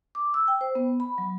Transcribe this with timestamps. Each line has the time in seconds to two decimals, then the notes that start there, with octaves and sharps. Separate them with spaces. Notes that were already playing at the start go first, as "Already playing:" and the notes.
0.15 D6
0.34 E6
0.48 G5
0.61 C5
0.75 B3
1.00 B5
1.18 F#3